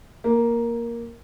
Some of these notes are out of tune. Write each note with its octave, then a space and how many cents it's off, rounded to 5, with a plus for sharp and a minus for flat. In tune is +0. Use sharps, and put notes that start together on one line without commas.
A#3 +5